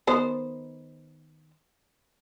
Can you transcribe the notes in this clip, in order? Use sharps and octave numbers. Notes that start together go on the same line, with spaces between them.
D#3 B3 C5